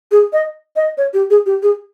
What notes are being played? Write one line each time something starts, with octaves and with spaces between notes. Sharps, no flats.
G#4
D#5
D#5
C#5
G4
G#4
G4
G#4